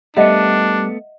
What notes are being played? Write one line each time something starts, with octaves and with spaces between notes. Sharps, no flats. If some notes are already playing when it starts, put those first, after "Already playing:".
G3 A3 B3 D4 D#5 E5 F#5